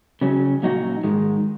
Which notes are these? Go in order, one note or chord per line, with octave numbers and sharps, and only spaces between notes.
C#3 F#3 C#4
A#2 F#3 D#4 F#4
G#2 D#3 G#3